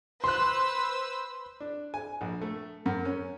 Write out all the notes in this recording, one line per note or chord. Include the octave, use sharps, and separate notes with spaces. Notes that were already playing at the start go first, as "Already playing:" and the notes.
B4 C5 C6 E6 F#6
D4
G#5
A#1
A3
F#2
C#4